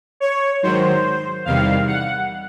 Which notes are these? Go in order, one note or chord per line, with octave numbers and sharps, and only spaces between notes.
C#5
G#2 D#3 F#3 C5
E2 C3 D#3 G3 F5
F#5